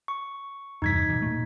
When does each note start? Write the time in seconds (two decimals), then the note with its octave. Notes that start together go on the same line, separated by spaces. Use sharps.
0.08 C#6
0.82 E2 G2 C3 D#4 G#6 B6
1.09 B2 E3
1.22 A#2 A3